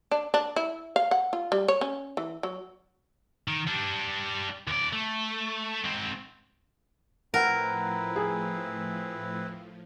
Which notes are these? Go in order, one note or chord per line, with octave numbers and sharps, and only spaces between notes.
D4
D4
E4
F5
F#5
F4
G3
C#5
C#4
E3
F#3
D#3
G3 D4
D#2 D5
A3
G#2 C4
A2 F3 C4 E4 A#4 B4 F#5
G#4